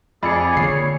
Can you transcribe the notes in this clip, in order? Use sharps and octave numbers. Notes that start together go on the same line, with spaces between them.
F2 G#4 D5 B5 C#7
D3 A#3 C#5 C7